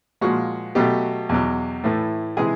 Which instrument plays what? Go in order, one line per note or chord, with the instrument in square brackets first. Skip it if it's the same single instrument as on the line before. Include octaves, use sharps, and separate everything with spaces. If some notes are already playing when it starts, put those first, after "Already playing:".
[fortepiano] A#2 F3 G#3 F#4
B2 F#3 A3 G4
E2 B2 F#3
A2 E3 A3
C3 E3 G#3 G#4